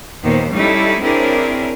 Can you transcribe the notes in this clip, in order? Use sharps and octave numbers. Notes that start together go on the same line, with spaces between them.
D#2 A#2 D#3 B3 C5
G3 C#4 D#4 E4 A4
C4 D4 E4 G#4 A#4 C#5